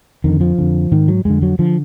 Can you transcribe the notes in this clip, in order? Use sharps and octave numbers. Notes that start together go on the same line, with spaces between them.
F2 D3 D#3
F3
F2 D3
G#2 D#3
F#3
F2 D3 G#3
F#3
D3 F3